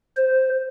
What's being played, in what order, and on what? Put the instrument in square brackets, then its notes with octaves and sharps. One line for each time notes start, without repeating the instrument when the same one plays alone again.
[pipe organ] C5